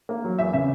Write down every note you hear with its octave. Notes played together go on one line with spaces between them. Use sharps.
A#3
F#3
E2 E5
C#3 E5